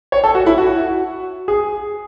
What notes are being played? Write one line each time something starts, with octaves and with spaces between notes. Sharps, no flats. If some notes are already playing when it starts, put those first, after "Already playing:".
C#5
A4
F#4
E4
F#4
G#4